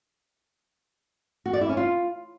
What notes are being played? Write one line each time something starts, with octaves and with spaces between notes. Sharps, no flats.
F#4
D5
E4
C#4
F4